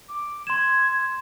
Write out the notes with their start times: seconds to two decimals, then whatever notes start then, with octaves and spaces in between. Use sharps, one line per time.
0.09 D6
0.47 C6 G#6 E7